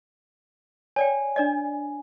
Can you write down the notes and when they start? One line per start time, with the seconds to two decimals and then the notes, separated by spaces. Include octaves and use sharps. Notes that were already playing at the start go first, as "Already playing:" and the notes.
0.96 C#5 D5 G5 G#5
1.36 D4 D5 D#5